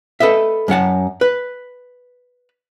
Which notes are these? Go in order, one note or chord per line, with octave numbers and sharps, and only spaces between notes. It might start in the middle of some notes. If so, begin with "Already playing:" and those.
A4 B4 D#5 E5
F#2 F#3 F#5 A5
B4